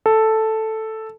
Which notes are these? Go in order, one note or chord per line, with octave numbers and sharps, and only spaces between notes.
A4